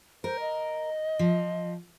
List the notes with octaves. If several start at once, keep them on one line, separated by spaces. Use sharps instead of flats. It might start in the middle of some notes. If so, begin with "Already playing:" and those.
A#4 C5
D#5
F3